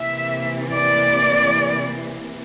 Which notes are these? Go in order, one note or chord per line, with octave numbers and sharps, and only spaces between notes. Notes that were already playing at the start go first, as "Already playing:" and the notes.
Already playing: C3 E3 A#3 E5
D5